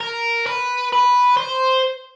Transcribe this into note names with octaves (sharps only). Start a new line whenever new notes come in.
A#4
B4
B4
C5